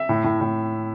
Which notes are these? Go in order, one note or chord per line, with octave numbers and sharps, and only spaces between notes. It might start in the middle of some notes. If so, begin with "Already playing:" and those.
Already playing: E5
A2
A2
A2